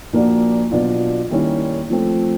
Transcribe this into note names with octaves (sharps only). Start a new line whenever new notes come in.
A#2 F3 A#3 D4 F#4
B2 F#3 B3 D4 F4
D#3 G3 A#3 C#4 E4
F3 A3 C4